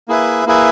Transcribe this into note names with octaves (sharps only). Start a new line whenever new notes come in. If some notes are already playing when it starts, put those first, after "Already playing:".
A#3 E4 G#4 B4 E5
A#3 E4 G#4 B4 E5